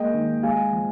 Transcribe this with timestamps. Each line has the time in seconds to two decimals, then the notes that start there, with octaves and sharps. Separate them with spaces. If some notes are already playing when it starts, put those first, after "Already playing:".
Already playing: G#3 A#3 D#5 G5
0.14 D#3
0.43 G#3 F5 G#5
0.73 F3